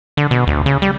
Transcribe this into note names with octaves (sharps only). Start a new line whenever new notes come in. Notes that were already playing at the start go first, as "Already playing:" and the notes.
D3
B2
D2
C#3
G3